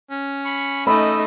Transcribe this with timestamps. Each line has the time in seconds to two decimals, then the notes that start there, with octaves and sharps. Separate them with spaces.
0.10 C#4
0.45 B5 C#6
0.87 A3 D#4 D#5 B5 E6